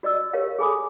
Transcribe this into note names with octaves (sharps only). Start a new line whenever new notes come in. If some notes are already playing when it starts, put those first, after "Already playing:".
F#4 D5 D#5 E6
G4 A#4 C#5 F5
G#4 A4 G#5 B5 D6 D#6